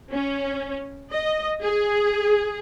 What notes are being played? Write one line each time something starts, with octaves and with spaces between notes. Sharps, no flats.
C#4
D#5
G#4